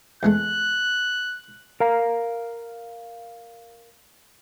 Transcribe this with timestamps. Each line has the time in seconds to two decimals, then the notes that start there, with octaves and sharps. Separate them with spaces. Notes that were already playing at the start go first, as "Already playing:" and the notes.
0.23 E2 G#3 A3 F#6
1.80 A#4 F5 A#5